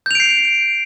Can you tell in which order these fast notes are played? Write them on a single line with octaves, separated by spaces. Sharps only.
G6 F7 D7 C7